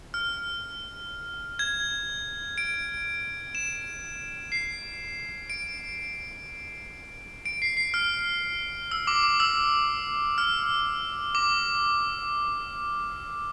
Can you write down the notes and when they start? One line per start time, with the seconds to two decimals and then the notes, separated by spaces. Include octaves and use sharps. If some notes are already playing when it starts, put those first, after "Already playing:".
0.14 F6
1.59 G#6
2.58 D7
3.55 E7
4.52 C7
5.50 D7
7.45 D7
7.62 C7
7.77 C7
7.94 F6
8.91 E6
9.07 D6
9.23 D6
9.40 E6
10.38 F6
11.35 D6